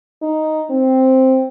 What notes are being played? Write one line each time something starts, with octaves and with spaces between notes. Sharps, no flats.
D#4
C4